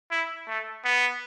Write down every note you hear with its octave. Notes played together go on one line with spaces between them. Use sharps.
E4
A3
B3